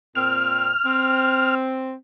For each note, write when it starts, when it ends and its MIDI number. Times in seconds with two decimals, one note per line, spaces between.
0.15 0.71 46
0.15 0.71 60
0.15 1.55 89
0.85 1.94 60